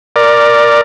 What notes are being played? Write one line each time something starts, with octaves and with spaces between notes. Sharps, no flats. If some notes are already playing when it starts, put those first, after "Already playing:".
A#4 D5